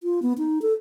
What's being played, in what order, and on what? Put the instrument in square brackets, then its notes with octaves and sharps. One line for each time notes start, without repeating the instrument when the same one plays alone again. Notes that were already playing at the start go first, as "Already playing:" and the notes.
[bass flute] F4
B3
D#4
A4